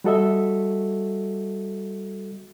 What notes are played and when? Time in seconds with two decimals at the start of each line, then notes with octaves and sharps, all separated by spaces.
0.04 G3 F#4 A4 D#5 E5